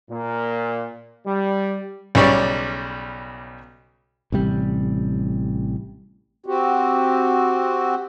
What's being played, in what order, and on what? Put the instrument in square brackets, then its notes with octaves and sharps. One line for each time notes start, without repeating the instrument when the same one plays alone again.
[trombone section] A#2
G3
[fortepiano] B1 C#3 G3 C#5 D5
[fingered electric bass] A1 C3 G3
[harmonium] C4 F#4 G4